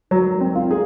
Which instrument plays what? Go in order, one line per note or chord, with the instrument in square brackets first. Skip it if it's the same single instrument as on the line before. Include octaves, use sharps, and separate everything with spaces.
[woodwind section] A#2 G#3 D#4 [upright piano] F#3
[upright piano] C4
F4
G#4